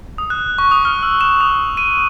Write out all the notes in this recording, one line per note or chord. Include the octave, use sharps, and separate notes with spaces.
D#6
F#6
C#6
D#6
F6
E6
E7
D#6
D#7